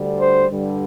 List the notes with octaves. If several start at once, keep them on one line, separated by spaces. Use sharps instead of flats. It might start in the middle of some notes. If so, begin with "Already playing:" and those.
Already playing: D2 D3 G3
C5
G2 D3 G3